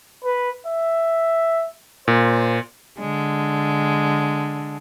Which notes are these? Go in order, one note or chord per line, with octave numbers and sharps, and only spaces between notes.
B4
E5
A#2 C5
D3 G#3